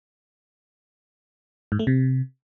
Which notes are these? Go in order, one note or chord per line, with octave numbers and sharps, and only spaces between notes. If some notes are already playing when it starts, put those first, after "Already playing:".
G#2
A3
C3